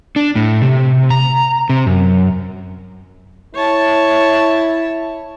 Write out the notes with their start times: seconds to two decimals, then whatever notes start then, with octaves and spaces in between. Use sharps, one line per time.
0.16 D4
0.36 A2
0.62 C3
1.10 A#5
1.69 C3
1.86 F#2
3.55 E4 C#5 A5